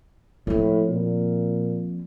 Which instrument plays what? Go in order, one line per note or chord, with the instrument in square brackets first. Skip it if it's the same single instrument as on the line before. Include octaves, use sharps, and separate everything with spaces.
[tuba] A2 [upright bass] F3 C4
[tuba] A#2